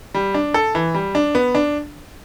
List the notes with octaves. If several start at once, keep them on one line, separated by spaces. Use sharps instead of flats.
G3
D4
A4
E3
G3
D4
B3
D4